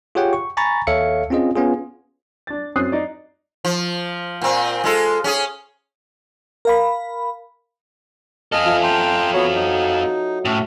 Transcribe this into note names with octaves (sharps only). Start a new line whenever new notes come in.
F4 G4 G#4 C#5 F#5 G5
C#6
G#5 A#5 B5 C#6 A6
D#2 A4 C#5 E5 F5 C#7
C4 C#4 F4 G#4 D#5
B3 C#4 F4 G#4
D4 A6
F#2 C4 C#5 D#6 F#6 C7
D#4 D5
F3
A#2 C4
G#3 F4 A4
C#4 G#4
A#4 F5 B5
F4 A4 D#5 G#5 F6
F3 A3
G5 A#5 C6
F#3 B3 C#5 A#5 C6
D#4
A2 C#4 E5